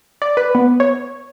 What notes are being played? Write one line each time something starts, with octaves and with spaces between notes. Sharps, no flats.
D5
B4
B3
C#5